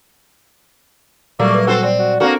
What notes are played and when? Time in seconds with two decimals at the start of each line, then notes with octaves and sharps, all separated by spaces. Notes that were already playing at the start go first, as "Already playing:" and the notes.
1.39 A#2 F#3 G3 A3 A#3 D5
1.53 B4
1.67 C4 F#4 A4 C5
1.83 C4 D5
1.99 F#4
2.20 A#3 C4 D4 F#4 A4 A#4